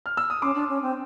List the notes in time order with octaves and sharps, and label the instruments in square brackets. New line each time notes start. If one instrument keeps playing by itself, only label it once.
[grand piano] F6
E6
D#6
[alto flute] C#4 [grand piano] C6 D6
[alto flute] D4
C#4
C4